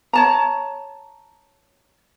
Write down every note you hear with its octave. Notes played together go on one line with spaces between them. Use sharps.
C#5 A5 A#5